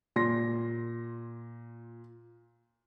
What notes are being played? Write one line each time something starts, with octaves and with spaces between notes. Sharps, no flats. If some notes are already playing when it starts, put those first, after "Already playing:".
A#2 C6 A#6